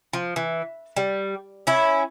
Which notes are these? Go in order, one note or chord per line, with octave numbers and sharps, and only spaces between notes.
F3
E3
G3
C#4 E4